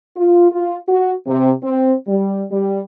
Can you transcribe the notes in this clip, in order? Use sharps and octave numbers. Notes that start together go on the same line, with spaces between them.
F4
F4
F#4
C3
C4
G3
G3